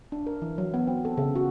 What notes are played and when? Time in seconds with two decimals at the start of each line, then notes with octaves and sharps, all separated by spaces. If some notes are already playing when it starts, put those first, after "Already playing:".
0.12 D4
0.27 A#4
0.42 E3
0.58 F#3
0.74 B3
0.87 C4
1.05 A4
1.17 C#3
1.36 F#4